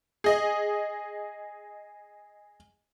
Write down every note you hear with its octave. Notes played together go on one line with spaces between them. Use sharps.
G#4 D#5